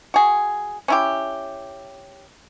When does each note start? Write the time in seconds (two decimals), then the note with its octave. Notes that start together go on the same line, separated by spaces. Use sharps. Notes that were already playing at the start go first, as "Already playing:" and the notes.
0.14 F#4 G#4
0.88 C#4 E4 G4